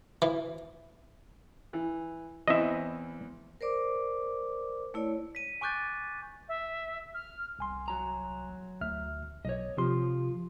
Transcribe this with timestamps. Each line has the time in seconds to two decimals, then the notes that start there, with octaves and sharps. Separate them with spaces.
0.22 E3
1.73 E3
2.48 E2 E3 C4 D#5 E5
3.61 A#4 C5 D5 D6
4.94 A3 E4 C#5 D5
5.35 B6 D#7
5.61 G#5 C#6 D6 F#6 G6 A6
6.48 E5
7.13 F6
7.59 C2 G#5 C6
7.88 F#3 A#5
8.81 D2 E5 F6
9.45 B1 C#5 D#5
9.77 C3 F3 F4 G4 C6